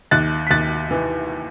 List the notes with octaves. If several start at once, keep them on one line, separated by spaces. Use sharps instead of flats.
D#2 F#6 A6
B6
D#2 F#6 A6
E3